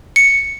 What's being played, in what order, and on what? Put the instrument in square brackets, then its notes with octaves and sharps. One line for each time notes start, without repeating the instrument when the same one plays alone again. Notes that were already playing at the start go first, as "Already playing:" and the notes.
[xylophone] C#7